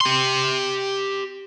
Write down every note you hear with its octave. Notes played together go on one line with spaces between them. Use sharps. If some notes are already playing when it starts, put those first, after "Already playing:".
G4 C6